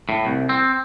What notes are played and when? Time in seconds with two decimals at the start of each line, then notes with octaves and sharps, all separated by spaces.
0.09 A2
0.25 C2
0.49 C4